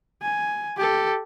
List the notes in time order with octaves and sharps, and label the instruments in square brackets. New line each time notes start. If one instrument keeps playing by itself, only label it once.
[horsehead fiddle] G#5
G4 A4